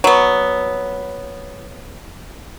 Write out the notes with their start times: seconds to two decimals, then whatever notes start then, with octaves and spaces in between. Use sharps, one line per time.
0.04 F#3 B3